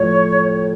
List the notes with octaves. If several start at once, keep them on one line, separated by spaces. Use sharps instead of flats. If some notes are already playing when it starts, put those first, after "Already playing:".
Already playing: A2 F3 A3 C#5